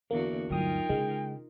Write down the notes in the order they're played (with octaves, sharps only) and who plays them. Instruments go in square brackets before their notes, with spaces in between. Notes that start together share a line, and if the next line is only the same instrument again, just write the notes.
[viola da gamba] E2 D3 F#4 [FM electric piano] A#3
[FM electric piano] D2 G2 D#6 [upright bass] F#3 [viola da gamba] D#4 F4 A#4 [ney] G5
[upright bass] C#3 [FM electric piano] G#3